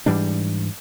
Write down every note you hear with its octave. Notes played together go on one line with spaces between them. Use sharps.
G#2 E3 G3 D4